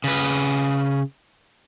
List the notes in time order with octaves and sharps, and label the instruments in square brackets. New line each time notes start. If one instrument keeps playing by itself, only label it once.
[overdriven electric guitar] C#3 B4